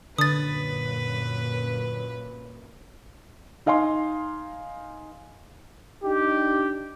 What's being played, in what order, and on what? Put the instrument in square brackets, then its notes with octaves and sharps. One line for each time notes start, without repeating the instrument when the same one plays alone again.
[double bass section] F#2 A#2 [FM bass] D3 [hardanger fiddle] B4 [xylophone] D#6 A6
[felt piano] D#4 D#5 F5 G#5 C6
[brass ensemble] D4 D#4 G4